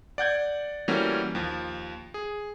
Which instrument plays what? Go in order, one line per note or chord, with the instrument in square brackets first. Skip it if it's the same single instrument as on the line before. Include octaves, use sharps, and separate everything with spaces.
[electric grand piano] D5 F#5 G6 G#6
E3 G3 A3 A#3 C#4 F#4
D#2 F3
G#4